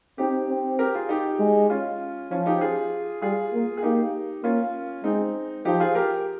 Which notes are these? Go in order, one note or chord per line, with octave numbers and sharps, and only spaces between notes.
C4 D#4 G4
C4
G4 A#4
F4 G#4
D#4 G4
G#3
C#4 F4
F3 C#4 F4
D#4 G4
F4 G#4
G3 F4 G#4
A#3
G#4
A#3 D#4 G4
A#3 C#4 F4
G#3 C4 D#4
F3 D#4 G4
F4 G#4
G4 A#4